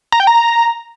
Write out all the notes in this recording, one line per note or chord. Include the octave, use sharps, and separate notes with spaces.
A#5
G5
A#5